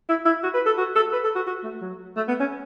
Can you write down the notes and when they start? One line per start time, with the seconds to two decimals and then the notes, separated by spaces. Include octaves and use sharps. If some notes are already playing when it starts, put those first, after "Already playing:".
0.09 E4
0.26 E4
0.43 F#4
0.54 B4
0.66 A4
0.78 F#4
0.96 A4
1.13 B4
1.24 A4
1.36 F#4
1.47 F#4
1.64 A3
1.82 F#3
2.16 A3
2.28 B3
2.40 C#4